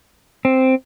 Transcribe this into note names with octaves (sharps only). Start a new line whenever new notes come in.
C4